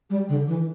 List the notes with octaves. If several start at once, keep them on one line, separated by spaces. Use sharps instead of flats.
G3
D3
E3